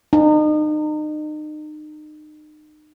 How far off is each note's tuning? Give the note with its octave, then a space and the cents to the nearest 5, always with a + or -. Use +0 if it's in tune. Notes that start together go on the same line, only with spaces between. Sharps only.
D#4 -35